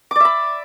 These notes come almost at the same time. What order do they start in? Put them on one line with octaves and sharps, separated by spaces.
D6 D5 E5 B5